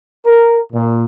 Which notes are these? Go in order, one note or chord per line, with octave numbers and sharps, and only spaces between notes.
A#4
A#2